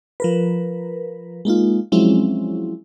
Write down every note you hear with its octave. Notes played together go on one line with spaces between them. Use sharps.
F3 A#4 B4
G#3 A#3 D#4 F4
F3 F#3 G#3 C4 C#4 E4